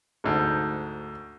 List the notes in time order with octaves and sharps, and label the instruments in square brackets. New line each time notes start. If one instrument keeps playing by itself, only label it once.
[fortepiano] D2 G#2